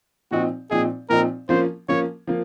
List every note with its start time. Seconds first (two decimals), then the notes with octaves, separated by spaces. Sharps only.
0.31 A#2 F3 C4 D#4 F#4
0.71 A#2 F3 C4 D#4 G#4
1.09 A#2 F3 C4 D#4 A#4
1.49 F3 A#3 C#4 C5
1.88 F3 A#3 C#4 C#5
2.27 F3 A#3